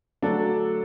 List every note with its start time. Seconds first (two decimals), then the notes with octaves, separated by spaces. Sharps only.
0.22 D3 F#3 A3 D4 A4